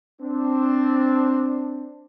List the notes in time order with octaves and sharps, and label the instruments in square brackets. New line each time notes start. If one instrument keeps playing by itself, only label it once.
[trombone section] C4 D4